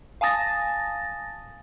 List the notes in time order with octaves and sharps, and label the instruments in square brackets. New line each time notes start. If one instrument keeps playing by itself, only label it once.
[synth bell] F5 G#5 A5 D#6 A6 A#6